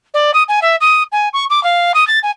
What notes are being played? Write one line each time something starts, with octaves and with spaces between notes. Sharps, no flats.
D5
D#6
G#5
E5
D#6
G#5
C#6
D6
F5
D#6
A6
G#5